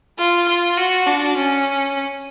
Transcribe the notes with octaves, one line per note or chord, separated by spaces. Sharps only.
F4
F4
F#4
D4
C#4